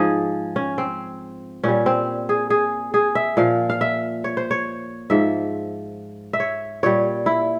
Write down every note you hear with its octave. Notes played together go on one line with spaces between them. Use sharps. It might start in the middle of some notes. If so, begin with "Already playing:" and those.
Already playing: G#2 F3 G#4
C#4
C4
A#2 G3 C#4
C4
G#4
G#4
G#4
E5
A#2 F3 F5
F5
E5
C#5
C5
C#5
G#2 F3 E5
E5
C#5
A#2 G3 C#5
E4